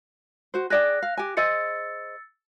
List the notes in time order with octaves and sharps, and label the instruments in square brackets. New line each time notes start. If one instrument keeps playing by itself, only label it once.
[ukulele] F#4 C5
[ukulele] G#4 D5 G5 [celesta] F#6 A#6
[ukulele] F5
G4 G#5
[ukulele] G#4 C5 D#5 [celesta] E6 A6 C#7